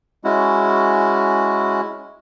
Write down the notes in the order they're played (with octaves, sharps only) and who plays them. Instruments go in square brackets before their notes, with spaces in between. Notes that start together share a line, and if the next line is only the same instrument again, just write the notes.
[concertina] G#3 C#4 E4 F#4